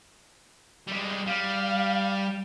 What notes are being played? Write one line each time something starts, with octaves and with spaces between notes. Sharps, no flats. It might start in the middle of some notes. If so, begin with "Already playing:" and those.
G3 G#3
G3 F5